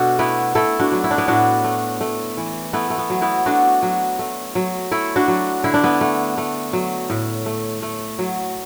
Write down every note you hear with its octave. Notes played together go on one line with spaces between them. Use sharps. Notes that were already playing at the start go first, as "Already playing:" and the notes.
Already playing: B2 D4 F#4 A4
A3 B3 E4
A3 E4 A4
D4 F#4
F#3
E4
D4
B3 E4
A2 D4 F#4
A3
A3
E3
A3 B3 E4
A3
B3
F#3
B3 E4
A3 D4 F#4
F#3
A3
F#3
A3 E4 A4
D4 F#4
F#3
D3 E4
D4
B3 E4
A3
A3
F#3
A2
A3
A3
F#3